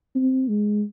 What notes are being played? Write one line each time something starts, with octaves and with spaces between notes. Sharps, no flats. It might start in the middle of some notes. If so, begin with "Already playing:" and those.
C4
G#3